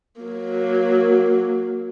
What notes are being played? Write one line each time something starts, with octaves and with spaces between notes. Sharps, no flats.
F#3 A#3